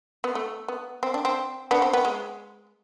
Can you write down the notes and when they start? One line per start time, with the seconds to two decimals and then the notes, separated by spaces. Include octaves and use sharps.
0.24 B3
0.35 A3
0.68 B3
1.03 C4
1.14 D4
1.25 C4
1.71 B3 D4
1.82 C4
1.93 B3
2.05 G#3